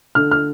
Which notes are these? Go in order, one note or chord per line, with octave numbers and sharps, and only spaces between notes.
D3 F6
F6